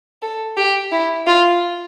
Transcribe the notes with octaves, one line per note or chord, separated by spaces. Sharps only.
A4
G4
E4
F4